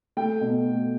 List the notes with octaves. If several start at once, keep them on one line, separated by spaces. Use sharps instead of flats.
A3 G5
B2
A3